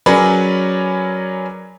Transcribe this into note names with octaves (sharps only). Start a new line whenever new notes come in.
F#3 C#4 G#4 A#4 B4 D5